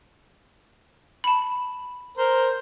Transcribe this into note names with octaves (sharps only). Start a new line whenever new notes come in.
A5 B5
A#4 C5